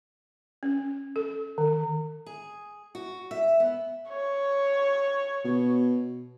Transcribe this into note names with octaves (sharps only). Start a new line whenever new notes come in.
C#4
A4
D#3
G#4
F#4
E5
B3
C#5
B2